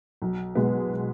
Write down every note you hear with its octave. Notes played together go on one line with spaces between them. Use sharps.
B1
B2 G#3 B3